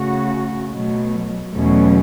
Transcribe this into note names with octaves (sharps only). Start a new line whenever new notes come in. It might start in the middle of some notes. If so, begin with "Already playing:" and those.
Already playing: C#3 A3 F#4
B2 F#3 A3
E2 B2 F#3 A3 C#4